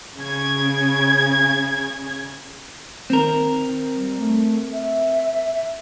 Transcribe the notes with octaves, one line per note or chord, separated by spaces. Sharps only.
C#3 G#6
D#3 C4 A#4
G3
A3
E5